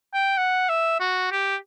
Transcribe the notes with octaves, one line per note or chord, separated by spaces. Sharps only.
G5
F#5
E5
F#4
G4